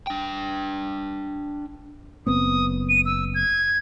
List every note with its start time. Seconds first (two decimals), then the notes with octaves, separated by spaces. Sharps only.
0.07 D4 G5
2.26 F#1 B3 C4 D#6
2.89 D#7
3.06 E6
3.35 G#6